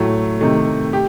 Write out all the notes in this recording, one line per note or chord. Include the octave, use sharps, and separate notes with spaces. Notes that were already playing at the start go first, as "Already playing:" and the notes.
Already playing: A2 F#3 A3
C3 D#3 A3
G4